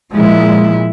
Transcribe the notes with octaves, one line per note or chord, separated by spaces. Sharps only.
A#2 F3 G#3 E4